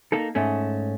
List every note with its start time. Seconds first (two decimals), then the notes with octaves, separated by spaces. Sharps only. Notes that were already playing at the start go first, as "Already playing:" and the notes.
0.12 A#3 D#4 A4
0.35 G#2 A3 C#4